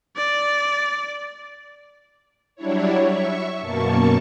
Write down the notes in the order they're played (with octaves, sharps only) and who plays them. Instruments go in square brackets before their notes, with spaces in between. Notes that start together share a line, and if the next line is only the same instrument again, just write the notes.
[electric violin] D5
[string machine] F#3 G3 D4 E4 C#5
E5 C#6
F#2 B2 A#3 A5 C#6